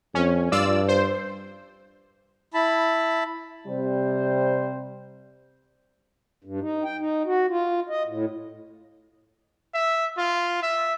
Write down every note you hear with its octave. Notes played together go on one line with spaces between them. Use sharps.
F2 C#4
G2 F4 D5 E6
C5
E4 A5 B5
C3 G3 C5
G2
D#4
G5
D#4
F#4
F4
D#5
A2
E5
F4
E5